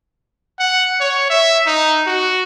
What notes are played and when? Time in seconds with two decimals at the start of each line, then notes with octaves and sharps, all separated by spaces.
0.59 F#5
1.01 C#5
1.30 E5
1.67 D#4
2.07 F#4